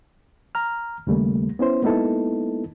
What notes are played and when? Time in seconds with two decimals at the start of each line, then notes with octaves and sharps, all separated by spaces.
0.55 A#5 F6
1.07 D#2 C#3 G3 A3 A#3
1.59 B3 C#4 E4 C5
1.82 G#3 A#3 B3 D#4 E4 A4